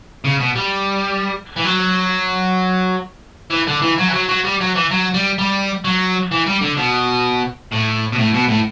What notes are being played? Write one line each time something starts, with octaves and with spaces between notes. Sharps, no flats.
C#3
B2
G3
E3
F#3
E3
D3
E3
F#3
E3
F#3
F#3
G3
F#3
E3
F#3
G3
G3
F#3
E3
G3
D3
B2
A2
B2
A2
B2
A2